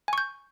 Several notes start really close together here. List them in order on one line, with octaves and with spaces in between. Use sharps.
G#5 C#6 G6